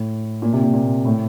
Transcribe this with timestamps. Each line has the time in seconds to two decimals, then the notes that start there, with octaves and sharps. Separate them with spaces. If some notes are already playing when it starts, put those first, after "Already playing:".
Already playing: A2
0.42 A#2
0.53 C3
0.63 A#2
0.74 A#2
1.05 A2